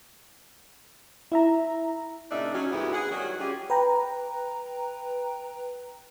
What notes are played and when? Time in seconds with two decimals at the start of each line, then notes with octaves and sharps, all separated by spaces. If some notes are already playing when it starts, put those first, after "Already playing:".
1.32 E4 E5 A#5
2.31 A#2 C#3 D4 D#4 E5
2.54 F#3 C#4
2.72 D2 G#2 B3 E4 F#4 G4
2.93 G#4 F#5
3.11 D#3 F#3 G3 F#4
3.40 G3 C#4 F4 G4 G#4
3.70 B4 G5 A#5